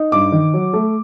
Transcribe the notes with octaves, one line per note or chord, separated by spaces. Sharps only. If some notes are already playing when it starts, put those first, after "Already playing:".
Already playing: D#4
G2 D6
D#3
F#3
A3